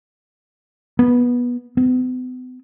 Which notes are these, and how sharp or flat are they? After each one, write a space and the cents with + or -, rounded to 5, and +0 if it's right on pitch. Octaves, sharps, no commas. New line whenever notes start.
B3 -15
B3 +40